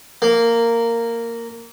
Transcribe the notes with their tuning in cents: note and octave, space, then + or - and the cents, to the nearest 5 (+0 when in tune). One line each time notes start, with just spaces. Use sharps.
A#3 -10